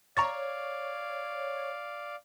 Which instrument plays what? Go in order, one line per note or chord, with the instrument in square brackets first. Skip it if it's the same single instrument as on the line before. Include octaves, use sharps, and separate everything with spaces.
[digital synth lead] C#5 [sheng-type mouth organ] D5 F5 [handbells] A#5 C#6 A6